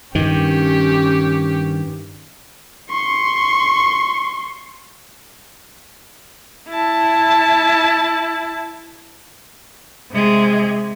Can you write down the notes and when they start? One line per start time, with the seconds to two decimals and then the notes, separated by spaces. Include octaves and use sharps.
0.15 G2 D#3 C#4 G4
2.90 C6 C#6
6.70 E4 A5
10.11 C3 G#3